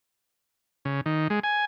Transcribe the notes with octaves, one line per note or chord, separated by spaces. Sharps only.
C#3
D#3
G#3
G#5